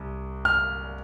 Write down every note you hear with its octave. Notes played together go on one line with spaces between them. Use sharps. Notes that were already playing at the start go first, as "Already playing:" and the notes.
Already playing: C2
F6